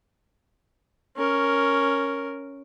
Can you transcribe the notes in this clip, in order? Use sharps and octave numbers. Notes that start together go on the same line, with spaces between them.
C#4 A#4